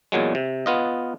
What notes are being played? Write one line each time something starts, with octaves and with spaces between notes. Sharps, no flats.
E2 A#2 F#3 G#3
C3
B3 F4 D#5